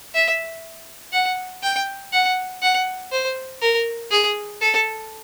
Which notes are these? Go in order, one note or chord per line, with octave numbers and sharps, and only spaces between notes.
E5
F#5
G5
F#5
F#5
C5
A#4
G#4
A4